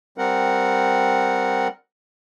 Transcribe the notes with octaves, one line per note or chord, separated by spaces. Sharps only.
G3 C4 A#4 F#5